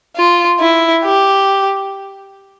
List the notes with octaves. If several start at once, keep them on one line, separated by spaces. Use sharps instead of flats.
F4
E4
G4